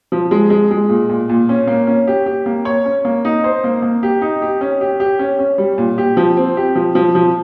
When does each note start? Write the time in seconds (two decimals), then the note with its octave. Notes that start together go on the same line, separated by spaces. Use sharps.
0.12 F3
0.31 G#3
0.50 G#3
0.71 G#3
0.89 A#2
1.09 A#2
1.29 A#2
1.49 C#4
1.67 A#3
1.87 C#4
2.07 G4
2.26 G4
2.46 A#3
2.65 C#5
2.85 C#4
3.05 A#3
3.25 D#4
3.44 C5
3.64 A#3
3.82 A#3
4.03 G4
4.22 D#4
4.42 G4
4.61 C#4
4.81 G4
5.00 G4
5.19 C#4
5.39 C#4
5.58 G3
5.78 A#2
5.98 G4
6.17 F3
6.37 C4
6.57 G4
6.75 F3
6.95 F3
7.15 F3